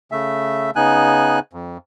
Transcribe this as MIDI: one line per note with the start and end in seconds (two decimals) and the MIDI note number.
0.12 0.70 49
0.12 0.70 57
0.12 0.70 76
0.76 1.39 49
0.76 1.39 59
0.76 1.39 63
0.76 1.39 80
0.76 1.39 90
1.53 1.78 41